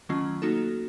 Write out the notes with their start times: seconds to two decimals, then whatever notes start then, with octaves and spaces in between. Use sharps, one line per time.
0.09 D#3 F#3 A3 C#4 F4
0.42 A#3 D#4 F#4 A4